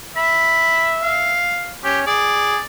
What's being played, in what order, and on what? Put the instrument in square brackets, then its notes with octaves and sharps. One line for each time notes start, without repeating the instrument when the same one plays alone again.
[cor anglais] E5 [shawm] B5
[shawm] F5
[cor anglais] C#4 [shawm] G4
[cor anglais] G#4 [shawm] D5